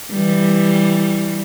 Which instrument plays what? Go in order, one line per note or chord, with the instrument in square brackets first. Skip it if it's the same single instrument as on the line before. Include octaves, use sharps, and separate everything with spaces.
[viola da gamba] E3 G3